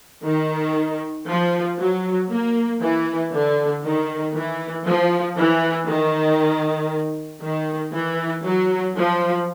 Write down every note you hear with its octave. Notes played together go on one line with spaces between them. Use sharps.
D#3
F3
F#3
A#3
E3
D3
D#3
E3
F3
E3
D#3
D#3
E3
F#3
F3